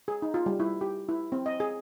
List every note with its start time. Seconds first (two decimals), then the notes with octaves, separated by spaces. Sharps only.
0.08 G#4
0.22 D#4
0.34 F4
0.46 G3
0.60 E4
0.81 G4
1.09 E4
1.32 C4
1.46 D#5
1.60 G#4